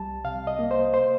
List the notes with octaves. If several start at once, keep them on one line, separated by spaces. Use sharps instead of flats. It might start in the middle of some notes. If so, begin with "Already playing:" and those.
Already playing: C2 G3 A5
C3 F5
D#5
A#3
C5
C5